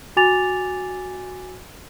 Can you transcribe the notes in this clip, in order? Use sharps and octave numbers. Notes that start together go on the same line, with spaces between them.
F#4 G#5 D6 A6 F7